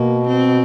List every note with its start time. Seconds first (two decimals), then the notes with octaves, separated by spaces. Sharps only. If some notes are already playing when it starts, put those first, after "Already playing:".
Already playing: B2 A#3
0.28 C4